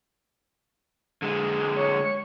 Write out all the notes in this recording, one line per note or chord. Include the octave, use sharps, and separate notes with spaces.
D3 G#3
C#5